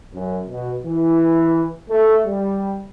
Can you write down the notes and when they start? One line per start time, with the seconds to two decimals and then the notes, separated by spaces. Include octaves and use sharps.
0.15 F#2
0.47 B2
0.85 E3
1.90 A3
2.26 G3